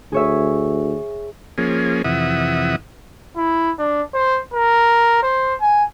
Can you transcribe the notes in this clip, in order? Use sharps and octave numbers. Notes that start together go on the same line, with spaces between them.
D2 G#4 C#5 E5
F3 A#3 C#4 G#4
F2 C3 E3 E5 F#5 D#6
E4
D4
C5
A#4
C5
G#5